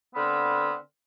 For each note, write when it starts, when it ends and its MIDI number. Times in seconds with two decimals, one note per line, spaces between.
0.16 0.74 50
0.16 0.74 59
0.16 0.74 60
0.16 0.74 71
0.16 0.74 89